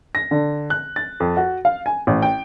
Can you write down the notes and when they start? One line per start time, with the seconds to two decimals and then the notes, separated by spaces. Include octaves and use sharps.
0.15 A#6
0.31 D3
0.70 F#6
0.96 A6
1.20 F2
1.37 F#4
1.65 F5
1.86 G#5
2.07 A1
2.22 G5